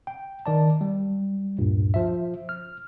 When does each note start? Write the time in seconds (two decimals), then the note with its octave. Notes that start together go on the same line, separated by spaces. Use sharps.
0.07 G5
0.46 D#3 D5 A5
0.81 G3
1.59 D2 G2 A#2
1.94 F3 E5
2.49 F6